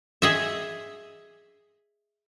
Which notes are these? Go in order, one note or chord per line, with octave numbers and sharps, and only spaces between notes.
G#4 D#5 E5